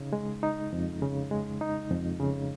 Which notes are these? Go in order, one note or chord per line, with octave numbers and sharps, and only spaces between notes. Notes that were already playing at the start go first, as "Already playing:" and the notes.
Already playing: C#3 D#4
G#3
D#4
F2
C#3
G#3
D#4
F2
C#3